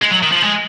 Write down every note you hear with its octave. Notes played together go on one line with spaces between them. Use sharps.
G#3
F#3
D#3
F3
G#3